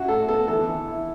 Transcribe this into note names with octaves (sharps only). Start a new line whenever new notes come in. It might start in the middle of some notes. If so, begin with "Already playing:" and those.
Already playing: C#4 E4 F#4
A2 A4
B3 A4
E3 A4
E3
E4